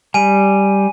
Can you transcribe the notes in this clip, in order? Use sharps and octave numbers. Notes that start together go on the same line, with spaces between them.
G3 G#5 D#7